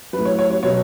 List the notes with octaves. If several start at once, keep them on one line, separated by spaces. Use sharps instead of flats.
F#3 B4
A2
C#5
C#5
C#5
B2 F#3 C#5